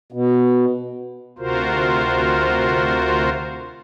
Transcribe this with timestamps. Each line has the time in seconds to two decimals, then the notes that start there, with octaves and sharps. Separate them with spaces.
0.12 B2
1.39 D2 C3 F4 F#4 A#4 C5